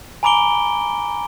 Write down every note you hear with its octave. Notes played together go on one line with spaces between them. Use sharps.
G#5 A#5 B5 D6 D7 G7